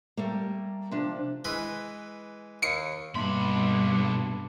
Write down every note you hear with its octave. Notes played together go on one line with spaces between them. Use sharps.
G3 A3 A#3
C3 F3 D4
E3 G#3 B4
D#2 C7 C#7
B1 G2 A#3 D4 B5 C6